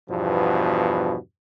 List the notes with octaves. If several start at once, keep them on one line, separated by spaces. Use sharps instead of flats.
E2 G2 B2 F3